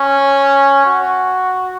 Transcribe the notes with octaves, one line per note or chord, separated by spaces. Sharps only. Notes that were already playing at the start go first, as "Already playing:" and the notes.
Already playing: C#4
F#4